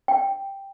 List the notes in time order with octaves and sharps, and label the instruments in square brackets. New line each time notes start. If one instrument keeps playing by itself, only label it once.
[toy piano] G5